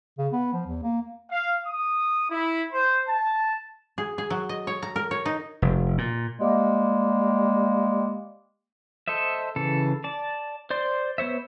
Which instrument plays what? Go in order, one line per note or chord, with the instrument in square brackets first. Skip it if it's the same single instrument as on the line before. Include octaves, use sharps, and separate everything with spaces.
[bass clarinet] C#3
B3
F3
E2
A#3
[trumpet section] F5
D#6
E4
C5
A5
[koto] G#4
G#4
F#3
D#5
C#5
A#5
A#4
C#5
D#4
[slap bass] F1
A#2
[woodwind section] G3 G#3 A#3
[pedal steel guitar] A4 C5 D#5 E5
C#3 E3 A4
D5 A5
C5 D5 C6
B3 C5 C#5 E5